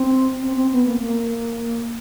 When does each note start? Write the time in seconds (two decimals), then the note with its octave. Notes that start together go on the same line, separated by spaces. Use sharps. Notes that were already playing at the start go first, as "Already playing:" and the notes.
Already playing: C4
0.43 C4
0.57 C4
0.72 B3
0.86 A#3
1.00 A#3